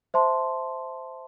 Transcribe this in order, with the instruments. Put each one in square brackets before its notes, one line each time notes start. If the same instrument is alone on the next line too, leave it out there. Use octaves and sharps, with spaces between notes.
[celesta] C5 E5 A5 C6